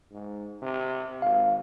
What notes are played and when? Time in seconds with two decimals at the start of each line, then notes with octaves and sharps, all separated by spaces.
0.11 G#2
0.62 C3
1.22 G#1 F5